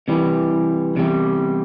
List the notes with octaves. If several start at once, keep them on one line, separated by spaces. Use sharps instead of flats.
C3 E3 G3
E2 C3 G3